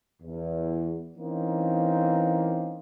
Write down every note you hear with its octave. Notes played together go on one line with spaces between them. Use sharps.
E2
E3 A#3 C4 C#4 D#4